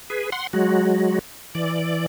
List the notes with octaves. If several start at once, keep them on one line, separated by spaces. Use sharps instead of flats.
G#4 B4
F#5 C6
F#3 G#3 F#4
E3 D5